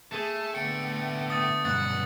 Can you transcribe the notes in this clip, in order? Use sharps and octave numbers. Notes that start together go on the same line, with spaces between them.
A3 G#4 A5
A2 D3 B3 G5 C#7
C#7
D#6 A6
B1 G2 F#5 A6